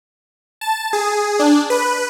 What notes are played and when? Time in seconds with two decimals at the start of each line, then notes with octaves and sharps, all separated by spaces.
0.61 A5
0.93 G#4
1.39 D4
1.70 B4